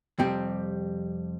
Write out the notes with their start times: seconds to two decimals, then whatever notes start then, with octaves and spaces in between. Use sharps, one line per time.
0.19 F2 C3 G3 C4 G4